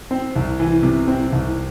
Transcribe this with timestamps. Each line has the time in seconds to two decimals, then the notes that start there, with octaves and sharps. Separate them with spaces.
0.11 C4
0.36 C2
0.60 E3
0.83 C3
1.08 C4
1.32 C2